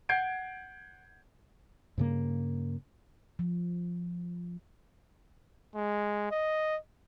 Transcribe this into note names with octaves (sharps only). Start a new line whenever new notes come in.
F#5 G6 G#6 C7 D7
G2 C#3 A#3
F3
G#3
D#5